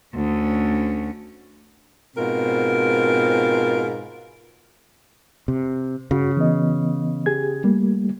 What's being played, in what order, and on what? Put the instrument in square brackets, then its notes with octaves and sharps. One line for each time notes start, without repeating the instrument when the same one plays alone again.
[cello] D2 C#4
[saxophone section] G#2 B2 C4 F4 A#4
[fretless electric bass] C3
[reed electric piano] G2 F#4 [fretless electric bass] C#3
[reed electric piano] E3 B3 D#5
G4 G#4 G#6
G3 A3 A#3